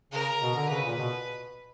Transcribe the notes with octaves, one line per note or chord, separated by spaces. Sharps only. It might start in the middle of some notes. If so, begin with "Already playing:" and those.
C#3 A#4
B2
D3
C#3 B4
A#2
B2